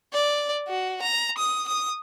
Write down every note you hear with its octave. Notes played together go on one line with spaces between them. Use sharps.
D5
F#4
A#5
D#6
D#6